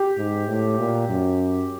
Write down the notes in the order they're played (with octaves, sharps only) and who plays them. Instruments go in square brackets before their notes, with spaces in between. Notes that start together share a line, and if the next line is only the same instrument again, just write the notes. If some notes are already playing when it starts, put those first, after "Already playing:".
Already playing: [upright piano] G4
[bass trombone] G#2
A2
A#2
F#2